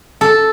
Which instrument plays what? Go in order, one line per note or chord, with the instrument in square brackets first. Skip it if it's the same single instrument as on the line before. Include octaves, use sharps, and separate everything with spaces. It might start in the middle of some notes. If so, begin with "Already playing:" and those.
[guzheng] A4